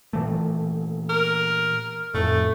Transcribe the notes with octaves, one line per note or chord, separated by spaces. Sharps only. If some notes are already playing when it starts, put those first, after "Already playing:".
A#2 E3 A3
A#4
F2 A2 A3